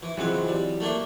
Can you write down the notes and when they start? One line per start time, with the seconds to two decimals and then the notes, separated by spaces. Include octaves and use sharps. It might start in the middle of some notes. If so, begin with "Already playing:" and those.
0.02 E3
0.17 C#2 E3 F#3 C4
0.48 G3
0.80 A3 A#3 D4